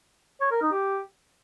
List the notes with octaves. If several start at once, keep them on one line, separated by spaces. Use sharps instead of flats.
C#5
A#4
D#4
G4